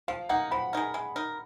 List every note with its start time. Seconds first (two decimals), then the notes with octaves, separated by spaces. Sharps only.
0.08 F3 F5
0.29 A#3 D#4 F#5
0.51 F3 B5
0.73 G#3 D#4 A#4
0.94 G#3
1.16 D#4 A#4